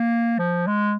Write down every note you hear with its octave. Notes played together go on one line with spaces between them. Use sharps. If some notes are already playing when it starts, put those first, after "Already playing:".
Already playing: A#3
F3
G#3